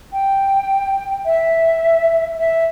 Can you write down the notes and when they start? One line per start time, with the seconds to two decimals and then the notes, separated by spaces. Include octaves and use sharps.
0.12 G5
1.25 E5
2.37 E5